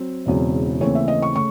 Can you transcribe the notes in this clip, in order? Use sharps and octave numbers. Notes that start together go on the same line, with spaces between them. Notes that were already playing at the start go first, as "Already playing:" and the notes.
Already playing: F#3 C4
E1 E2 C#3 F#3 C4
D#2 C#3 E3 A3 C4 C#5
E5
D#5
C#6
C#3 A3 C#6